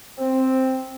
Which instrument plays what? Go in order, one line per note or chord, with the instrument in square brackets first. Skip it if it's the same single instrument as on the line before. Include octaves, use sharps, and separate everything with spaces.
[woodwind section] C4